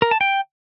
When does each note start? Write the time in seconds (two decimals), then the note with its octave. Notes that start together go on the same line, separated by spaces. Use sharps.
0.02 A#4
0.11 A5
0.21 G5